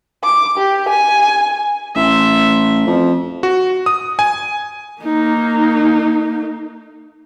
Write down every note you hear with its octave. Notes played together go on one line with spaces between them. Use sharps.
D6
G4
G#5
A1 E5 C6
F2
F#4
D#6
G#5
A#3 D#4